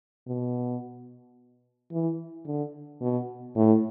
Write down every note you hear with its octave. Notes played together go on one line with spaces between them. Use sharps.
B2
E3
D3
B2
A2